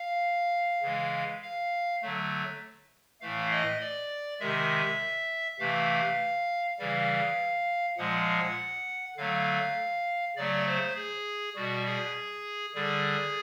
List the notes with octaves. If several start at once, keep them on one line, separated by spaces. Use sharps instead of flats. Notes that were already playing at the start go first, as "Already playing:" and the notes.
Already playing: F5
C#3 E3 G#3
F5
D3 F#3 A3
A2 E3 A3 F5
D#5
D5
C3 D#3 G#3 E5
C3 E3 A3 F5
C#3 E3 G3 F5
A#2 F3 G#3 F#5
D3 F#3 A3 F5
C#3 F#3 A3 D5
C5
G#4
B2 G3 F#4
G#4
D3 G3 G#4